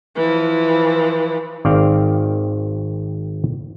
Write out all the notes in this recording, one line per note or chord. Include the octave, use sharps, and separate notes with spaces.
E3 F3
G#1 D#3 C4 D5 F5 G5